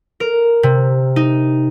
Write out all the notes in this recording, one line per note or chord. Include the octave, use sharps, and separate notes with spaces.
A#4
C3
D#4